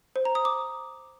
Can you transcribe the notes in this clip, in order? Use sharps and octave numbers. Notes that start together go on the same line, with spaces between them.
C5
A#5
D#6
D6